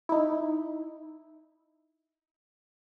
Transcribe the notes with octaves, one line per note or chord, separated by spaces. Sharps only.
D#4 E4